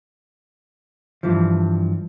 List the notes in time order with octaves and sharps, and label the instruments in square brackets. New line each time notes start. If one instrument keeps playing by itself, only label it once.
[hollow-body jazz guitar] G2 E3 F3